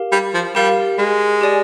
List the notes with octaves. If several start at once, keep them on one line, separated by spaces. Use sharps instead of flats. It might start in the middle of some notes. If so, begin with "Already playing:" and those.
Already playing: G4 A#4 F5
G3
F3
G3 G4 A#4 F5
G#3
G4 D5 G#5